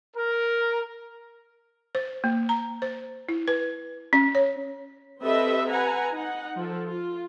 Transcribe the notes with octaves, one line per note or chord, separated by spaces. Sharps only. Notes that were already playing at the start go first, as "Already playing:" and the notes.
A#4
C5
A#3
A#5
C5
E4
B4
C#4
C#5
C4 G4 A4 B4 D#5 E5
B4 F#5 G#5 A#5
D#4 F#5
F3 A4
F4